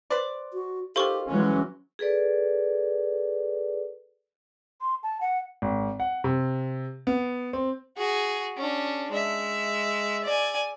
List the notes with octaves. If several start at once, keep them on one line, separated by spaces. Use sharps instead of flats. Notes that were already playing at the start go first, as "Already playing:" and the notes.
B4 C5 D5
F#4
D#3 F4 G4 A4 C5 C#6
E3 F#3 G#3 C#4
G#4 A4 B4 D5
C6
A5
F#5
G#1
F#5
C3
B3
C4
F#4 G#4
C#4 D4
G#3 E5
D5 G#5